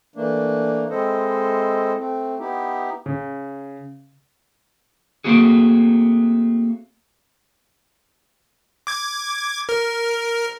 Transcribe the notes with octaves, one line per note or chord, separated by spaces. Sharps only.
E3 A3 A#3 D4
G#3 C4 E4 A4 C5 D#5
A3 C4
B3 D#4 E4 G4
C#3
A3 A#3 C4 F#4 G#4
D6 G#6
A#4